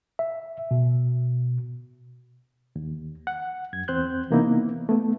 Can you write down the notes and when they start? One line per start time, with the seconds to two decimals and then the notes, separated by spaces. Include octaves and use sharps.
0.19 E5
0.71 B2
2.76 D#2
3.27 F#5
3.73 F#2 G#6
3.88 E2 C4 C5 F#6 G6
4.31 C3 E3 A#3 B3 D#4 E4
4.89 A3 B3